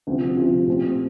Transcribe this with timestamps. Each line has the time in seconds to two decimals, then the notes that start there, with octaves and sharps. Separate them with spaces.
0.07 D2 C3 F3 C4
0.37 D2 C3 F3 C4
0.67 A#2 A3 C4 G4